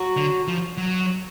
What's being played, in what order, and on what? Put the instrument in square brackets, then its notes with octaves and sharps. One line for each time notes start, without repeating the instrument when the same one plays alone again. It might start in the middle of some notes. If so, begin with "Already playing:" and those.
Already playing: [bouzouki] F#3 F#4
[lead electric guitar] D3
F3
F#3